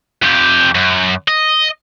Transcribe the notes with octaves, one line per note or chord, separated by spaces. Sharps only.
F2 G4
F#2
D#5